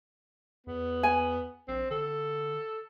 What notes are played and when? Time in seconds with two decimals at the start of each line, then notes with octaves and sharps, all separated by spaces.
0.67 E2 B3
1.03 G#5
1.68 A#1 C4
1.91 D3 A4